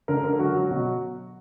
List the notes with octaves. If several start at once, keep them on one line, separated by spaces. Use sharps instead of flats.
D3 A#4
D3 A#4
F#3 F#4
F#3
B2 F#4